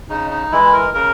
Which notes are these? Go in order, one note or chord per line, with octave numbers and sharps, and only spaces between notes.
C#3 D#4
D#4
E3 G#3 E4
A#4
C#3 A#4